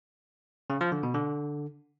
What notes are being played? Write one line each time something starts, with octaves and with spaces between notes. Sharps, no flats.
C#3
F3
D3
B2
D3